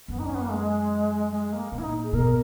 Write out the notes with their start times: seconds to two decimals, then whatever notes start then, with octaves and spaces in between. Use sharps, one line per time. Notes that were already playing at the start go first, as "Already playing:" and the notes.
0.08 F#2 B3
0.19 D#4
0.26 C#4
0.34 B3
0.42 A#3
0.49 G#3
1.32 G#3
1.53 A#3
1.72 A#2 A#3
1.78 E4
1.83 D#4
2.03 G#4
2.13 B2 A#4